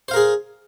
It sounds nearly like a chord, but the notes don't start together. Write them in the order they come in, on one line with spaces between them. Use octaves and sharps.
C5 F5 A#4 G#4